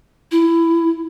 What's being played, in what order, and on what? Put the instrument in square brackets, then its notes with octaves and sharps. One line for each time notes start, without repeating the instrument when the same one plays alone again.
[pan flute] E4